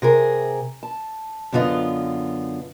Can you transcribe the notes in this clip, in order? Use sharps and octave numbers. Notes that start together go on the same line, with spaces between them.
C3 G#4 A#4
A5
F#2 D3 B3 F4 D#5